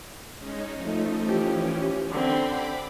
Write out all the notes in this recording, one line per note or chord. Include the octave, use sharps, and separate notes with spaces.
G#3 C#4 D#4
F3 A3 D#4
E3 F3 C#4 G4
D3 C4 B5 C6
B5 D6